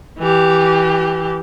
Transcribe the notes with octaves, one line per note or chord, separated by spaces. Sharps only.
E3 G4